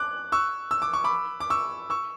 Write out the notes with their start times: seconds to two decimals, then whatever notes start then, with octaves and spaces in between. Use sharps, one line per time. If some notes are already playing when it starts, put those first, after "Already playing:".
Already playing: D6 F#6
0.32 C#6 E6
0.71 E6
0.82 D6
0.93 C#6
1.04 B5 D6
1.40 D6
1.50 C#6 E6
1.90 C#6 E6